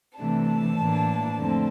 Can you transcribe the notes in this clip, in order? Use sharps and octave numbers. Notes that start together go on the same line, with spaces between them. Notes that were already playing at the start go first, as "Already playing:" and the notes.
C3 E3 A3 D4 A5
A2 E3 A#3 D4
F2 D3 A3 C4